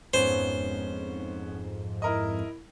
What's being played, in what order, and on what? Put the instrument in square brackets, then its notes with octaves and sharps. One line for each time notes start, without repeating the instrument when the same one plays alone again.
[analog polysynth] F2 G#2 [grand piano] B3 C#4 [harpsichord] C5
[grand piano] E4 A#4 D#5